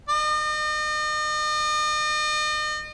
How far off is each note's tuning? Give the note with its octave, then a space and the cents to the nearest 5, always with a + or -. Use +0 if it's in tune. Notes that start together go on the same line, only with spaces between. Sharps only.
D#5 -40